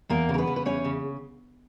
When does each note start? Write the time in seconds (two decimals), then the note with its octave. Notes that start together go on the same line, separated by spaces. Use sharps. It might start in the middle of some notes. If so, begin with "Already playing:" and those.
0.09 E2 A#3 A#4
0.29 C#3
0.34 A#4
0.38 B3 B4
0.47 C#3
0.56 B4
0.66 E2 C#4 C#5
0.84 C#3